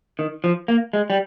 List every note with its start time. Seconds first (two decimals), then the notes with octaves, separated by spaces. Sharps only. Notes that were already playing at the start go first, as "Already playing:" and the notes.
0.19 D#3
0.44 F3
0.68 A#3
0.93 G#3
1.10 G3